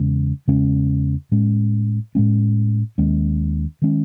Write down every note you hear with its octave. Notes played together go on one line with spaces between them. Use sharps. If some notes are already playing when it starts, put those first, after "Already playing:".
Already playing: E2 C#3 G#3 C#4
E2 C#3 G#3 C#4
A2 G#3 C#4
A2 G#3 C#4
D#2 D#3 G#3 C#4
D#3 G#3 C#4